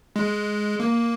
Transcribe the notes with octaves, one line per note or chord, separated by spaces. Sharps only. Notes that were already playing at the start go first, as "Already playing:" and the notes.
G#3
A#3